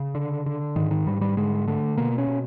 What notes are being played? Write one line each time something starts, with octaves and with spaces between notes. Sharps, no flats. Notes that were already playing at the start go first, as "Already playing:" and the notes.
Already playing: C#3
D3
D3
G#2 D#3
D#3
G#2 G3
G3
D3 G#3
D3 A3
B2 A#3
C#4
B2